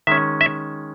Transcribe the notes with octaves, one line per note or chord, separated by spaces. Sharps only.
D#3 G#3 C#4 E5
E5